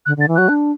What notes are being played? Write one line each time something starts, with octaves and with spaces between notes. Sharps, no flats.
D3 F#6
D3 A6
E3
F#3 F#6
D4